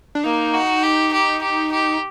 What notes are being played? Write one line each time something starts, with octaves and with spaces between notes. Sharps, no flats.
D4
A#3 D#4
F#4
G4
G4
G4
G4